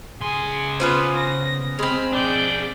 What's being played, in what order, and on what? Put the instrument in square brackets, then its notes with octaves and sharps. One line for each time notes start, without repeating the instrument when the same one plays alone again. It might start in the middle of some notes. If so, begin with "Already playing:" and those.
[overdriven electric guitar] C#3 C6 [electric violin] G#4 G#5
[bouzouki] B3 C#4 C5 [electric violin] F4 B4
[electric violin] A#6
[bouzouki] G#3 C4 [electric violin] B5 F6
[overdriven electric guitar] D4 G#4 [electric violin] D5 G6